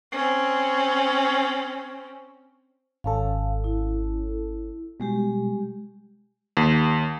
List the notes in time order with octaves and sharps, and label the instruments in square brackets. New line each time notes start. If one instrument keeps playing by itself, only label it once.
[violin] C4 C#4
[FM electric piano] G#1 C#4 A4 [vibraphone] F5
[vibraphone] E4
[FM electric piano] B2 [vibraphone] G3 G#3 G4
[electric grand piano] D#2